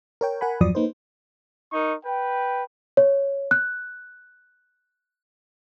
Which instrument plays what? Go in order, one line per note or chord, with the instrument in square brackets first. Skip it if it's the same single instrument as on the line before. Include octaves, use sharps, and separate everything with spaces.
[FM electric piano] A#4 C#5 G5
A#4 F#5 G#5 B5
E2 G2 F3 F#3 D5 D#6
A#3 D#4 B4 C5
[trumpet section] D#4 A#4 C#6
B4 G5
[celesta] C#5
F#6